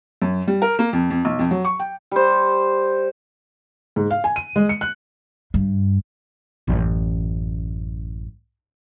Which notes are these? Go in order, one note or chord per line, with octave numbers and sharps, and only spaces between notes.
F#2
G3
A#4
A#3
F2
F2
B1
F2
F#3
C#6
G5
G3 C5
G#2
F5
G#5
D#7
G#3
C#7
F#6
G2
A1 F#2